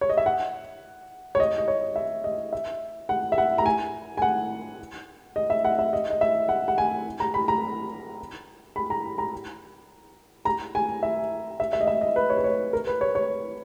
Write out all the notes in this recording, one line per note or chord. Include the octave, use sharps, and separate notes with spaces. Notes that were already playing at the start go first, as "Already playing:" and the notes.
C#5
D#5
E5
F#5
C#5
D#5
D#5
C#5
E5
D#5
E5
F#5
E5
F#5
A#5
G#5
G#5
F#5
D#5
E5
F#5
E5
D#5
D#5
E5
F#5
F#5
G#5
A#5
B5
A#5
B5
A#5
A#5
A#5
G#5
E5
E5
E5
D#5
E5
D#5
B4
C#5
B4
C#5
A#4
B4
C#5
C#5